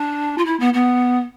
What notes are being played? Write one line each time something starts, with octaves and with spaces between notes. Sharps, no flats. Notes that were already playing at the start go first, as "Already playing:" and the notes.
Already playing: D4
F4
E4
B3
B3